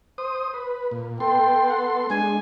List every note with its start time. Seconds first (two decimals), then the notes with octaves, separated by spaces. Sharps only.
0.18 C5 D#6
0.54 B4
0.91 A#2
1.20 B3 A4 G5 C6
1.68 F#5
2.10 G#3 D4 G#5